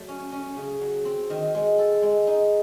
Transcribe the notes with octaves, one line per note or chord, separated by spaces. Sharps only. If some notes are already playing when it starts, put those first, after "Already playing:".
Already playing: F#3 A3
C#4
C#4
C#3
F#3
C4
D#3
G#3
A4
G#3
D#4